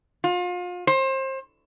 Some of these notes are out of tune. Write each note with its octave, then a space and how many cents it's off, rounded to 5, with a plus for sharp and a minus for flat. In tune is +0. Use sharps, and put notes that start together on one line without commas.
F4 +35
C5 +30